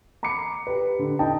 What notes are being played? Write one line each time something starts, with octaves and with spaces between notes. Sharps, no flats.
A#5 B5 D6 C7 C#7
G4 B4
D3
D#4 G5 A5